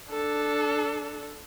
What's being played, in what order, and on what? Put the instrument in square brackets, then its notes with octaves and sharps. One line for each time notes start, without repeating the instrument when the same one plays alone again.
[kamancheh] D4 A4